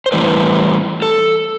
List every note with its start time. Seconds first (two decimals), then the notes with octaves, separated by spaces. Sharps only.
0.06 C5
0.12 A2 E3 G3 B4
1.02 A4